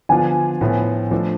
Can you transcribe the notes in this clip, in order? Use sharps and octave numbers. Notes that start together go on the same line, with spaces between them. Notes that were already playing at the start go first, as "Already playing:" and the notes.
D3 F3 B3 D4 F4 G#5
A2 F3 B3 F4
F3 A3 D4